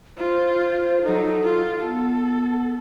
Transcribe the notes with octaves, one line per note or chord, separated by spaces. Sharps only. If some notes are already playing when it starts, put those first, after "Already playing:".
F4 C5
F#3 D#4 A4
F4
B3 A4